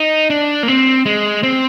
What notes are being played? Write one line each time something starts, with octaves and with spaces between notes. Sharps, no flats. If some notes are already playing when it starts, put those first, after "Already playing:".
Already playing: D#4
D4
A#3
C4
G#3
C4